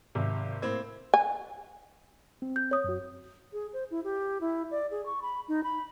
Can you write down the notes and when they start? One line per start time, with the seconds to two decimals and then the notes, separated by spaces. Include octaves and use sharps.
0.15 G#1 C3
0.62 A2 A#3 C4 G#6
1.14 G#5
2.42 C4
2.56 G6
2.71 C#5 D#6
2.84 F#2 F#4
3.53 G#4
3.73 C5
3.91 E4
4.04 G4
4.41 E4
4.71 D5
4.91 G#4
5.06 C#6
5.22 B5
5.48 D#4
5.64 B5